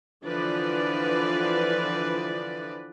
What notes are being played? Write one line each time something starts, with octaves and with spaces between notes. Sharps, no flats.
D3 E3 F3 B4 D5